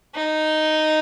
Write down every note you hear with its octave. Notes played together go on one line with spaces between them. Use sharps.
D#4